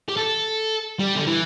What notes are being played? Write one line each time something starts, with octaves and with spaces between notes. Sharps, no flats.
G4
A4
G3
D3
E3